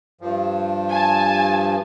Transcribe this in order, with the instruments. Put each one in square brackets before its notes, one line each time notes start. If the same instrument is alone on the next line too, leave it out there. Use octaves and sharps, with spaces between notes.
[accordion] G2 F3
[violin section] G#5 A5